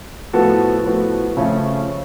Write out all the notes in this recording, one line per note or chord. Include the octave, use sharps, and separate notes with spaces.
A2 F3 B3 F#4 A4
A2 F3 B3 F#4 A4
C#3 F3 A3 C#4